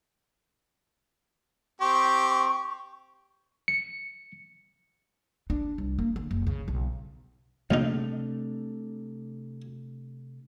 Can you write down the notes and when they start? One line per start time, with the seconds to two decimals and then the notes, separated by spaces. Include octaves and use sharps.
1.81 C4 G4 C#6
3.68 C#7
5.50 D4
5.78 C2
5.99 A#3
6.16 D3
6.31 F#1
6.47 C#3
6.68 B1
7.71 A#1 C3 A3 D4 D#4